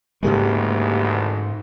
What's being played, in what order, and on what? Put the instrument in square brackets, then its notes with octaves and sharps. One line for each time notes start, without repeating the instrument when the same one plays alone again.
[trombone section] G#1 D2 E3 [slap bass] G#2 C#3 G#3 [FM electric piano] A#3 G4